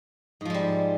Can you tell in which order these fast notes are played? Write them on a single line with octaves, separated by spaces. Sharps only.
G#2 F3 G#3 G3